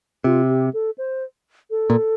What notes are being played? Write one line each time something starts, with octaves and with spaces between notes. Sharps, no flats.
C3 F4
G4
A4
C5
A4
A#2